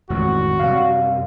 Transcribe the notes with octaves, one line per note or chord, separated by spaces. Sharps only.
A1 F2 A2 D#3 G#3 C4 F#4
F#2 C3 G3 F5